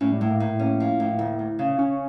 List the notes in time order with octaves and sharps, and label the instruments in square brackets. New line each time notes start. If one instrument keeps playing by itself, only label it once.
[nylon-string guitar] A2 [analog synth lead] C#4
[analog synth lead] G3
[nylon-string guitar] A2 [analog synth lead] A3
[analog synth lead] A#3
[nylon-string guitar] A2
[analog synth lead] A#3 [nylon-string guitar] C#4
[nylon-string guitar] F3
A2
D2
D2
C#3
[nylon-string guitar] C#3 [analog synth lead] C#4